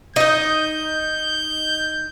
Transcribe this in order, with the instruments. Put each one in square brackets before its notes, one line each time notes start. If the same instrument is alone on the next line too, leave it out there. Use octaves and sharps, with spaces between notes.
[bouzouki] D#4 D#5 [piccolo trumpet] G6